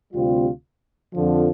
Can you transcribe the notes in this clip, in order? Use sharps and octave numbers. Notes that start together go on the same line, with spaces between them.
D2 C3 G3 C4 F4
F2 D3 F3